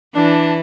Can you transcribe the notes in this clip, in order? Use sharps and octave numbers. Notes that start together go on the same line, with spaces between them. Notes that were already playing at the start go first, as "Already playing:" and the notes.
E3 D4